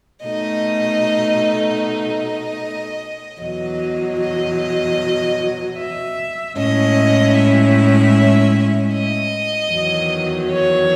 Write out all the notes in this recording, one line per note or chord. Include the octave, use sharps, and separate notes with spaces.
B2 A3 D#4 D#5
D#5
E2 B2 F#3 D#5
D#5
E5
A2 G#3 C#4 E4 D#5
E5
D#5
E2 D#3 F#3
C#5